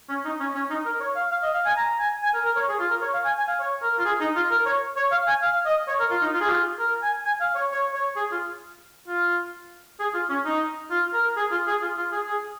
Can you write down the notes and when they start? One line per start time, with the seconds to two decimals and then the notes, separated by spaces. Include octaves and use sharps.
0.09 C#4
0.25 D#4
0.40 C#4
0.55 C#4
0.70 D#4
0.85 A#4
1.00 C#5
1.16 F5
1.31 F5
1.43 D#5
1.54 F5
1.65 G#5
1.77 A#5
1.99 G#5
2.23 G#5
2.34 A#4
2.45 A#4
2.56 C#5
2.68 G#4
2.79 F4
2.90 A#4
3.02 C#5
3.14 F5
3.25 G#5
3.37 G#5
3.47 F5
3.59 C#5
3.82 A#4
3.99 F4
4.05 G#4
4.20 D#4
4.36 F4
4.51 A#4
4.66 C#5
4.97 C#5
5.12 F5
5.27 G#5
5.42 F5
5.65 D#5
5.88 C#5
6.00 A#4
6.11 F4
6.22 D#4
6.33 F4
6.41 G#4
6.49 F4
6.79 A#4
7.02 G#5
7.25 G#5
7.40 F5
7.55 C#5
7.71 C#5
7.94 C#5
8.16 G#4
8.31 F4
9.08 F4
9.99 G#4
10.14 F4
10.29 C#4
10.45 D#4
10.90 F4
11.13 A#4
11.37 G#4
11.51 F4
11.67 G#4
11.82 F4
11.97 F4
12.12 G#4
12.27 G#4